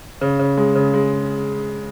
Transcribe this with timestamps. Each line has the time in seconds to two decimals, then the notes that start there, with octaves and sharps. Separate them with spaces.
0.21 C#3
0.39 C#3
0.57 G#3
0.75 C#3
0.94 G#3